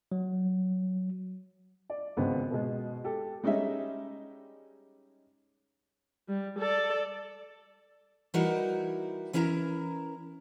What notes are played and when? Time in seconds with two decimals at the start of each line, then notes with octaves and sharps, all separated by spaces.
0.12 F#3
1.90 D5
2.17 G#1 C#2 G#3 B3 C4
2.50 B2 G#3
3.04 G4 A4
3.43 G3 G#3 C#4 D#4 E5
6.28 G3
6.59 A4 D5
8.34 E3 G3 D#4 E4 F#4 A#4
9.33 E3 C#4 E4 A#4 F#5 A#5